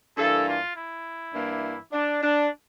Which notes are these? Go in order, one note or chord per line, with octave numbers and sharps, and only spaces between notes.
G2 E3 A#3 A4
F4
E4
G2 E3 A#3
D4
D4